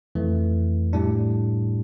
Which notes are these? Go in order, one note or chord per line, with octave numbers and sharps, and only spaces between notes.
F2 E3 A3
A2 G3 D4